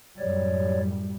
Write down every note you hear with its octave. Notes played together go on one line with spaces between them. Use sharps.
F#2 A2 G3 C#5 D5